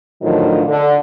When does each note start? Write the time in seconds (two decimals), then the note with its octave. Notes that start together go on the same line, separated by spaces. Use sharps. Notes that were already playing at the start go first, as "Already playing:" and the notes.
0.22 A2 D3 D#3 F3 F#3
0.68 D3